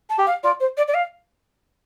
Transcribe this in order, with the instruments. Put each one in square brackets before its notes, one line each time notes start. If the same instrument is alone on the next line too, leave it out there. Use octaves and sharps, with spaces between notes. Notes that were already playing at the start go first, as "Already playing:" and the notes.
[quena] A5
[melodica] G4
[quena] F5
[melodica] F4 [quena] D5
[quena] C5
D5
D5
F5